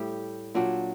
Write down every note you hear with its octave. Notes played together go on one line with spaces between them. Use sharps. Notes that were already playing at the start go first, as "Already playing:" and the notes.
Already playing: A2 G3 G4
A#2 F#3 D4